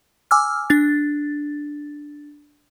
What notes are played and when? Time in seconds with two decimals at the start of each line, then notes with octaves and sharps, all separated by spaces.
0.31 G#5 D6 E6 F6
0.70 D4 A6